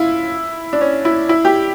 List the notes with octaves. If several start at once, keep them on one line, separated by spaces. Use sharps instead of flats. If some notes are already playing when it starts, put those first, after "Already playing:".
Already playing: E4 F4
D4
C#4
E4
E4
G4